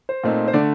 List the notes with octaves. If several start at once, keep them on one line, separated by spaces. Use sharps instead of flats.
C5
A#2 A3 C4 D#4
C5
D3 A3 D5